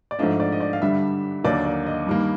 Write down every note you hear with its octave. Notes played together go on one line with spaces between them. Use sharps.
D5
G#2 F3 A3 D4 F4 D#5
D5
D#5
D5
F5
G2 D3 G3 E5
D#2 D3 F#3 A#3 D#4 D5
D5
D#5
G2 D#3 G3 A#3